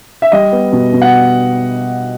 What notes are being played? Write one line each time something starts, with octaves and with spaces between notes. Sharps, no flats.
E5
G3 D#5
B3
B2
B2
F#5